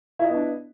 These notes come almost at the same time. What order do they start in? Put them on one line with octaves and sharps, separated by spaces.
E4 D#5 B3 D4